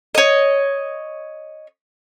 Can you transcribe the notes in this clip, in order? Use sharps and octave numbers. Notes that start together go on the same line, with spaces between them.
C#5 D#5